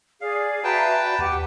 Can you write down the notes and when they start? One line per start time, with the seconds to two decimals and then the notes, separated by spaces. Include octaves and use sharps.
0.21 G#4 D5 F5
0.64 F#4 B4 E5 G5 A5 A#5
1.01 F#4 D5
1.18 D#2 G4 F#5